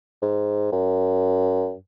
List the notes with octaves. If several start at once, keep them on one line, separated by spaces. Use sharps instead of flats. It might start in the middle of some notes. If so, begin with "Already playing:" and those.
G#2
F#2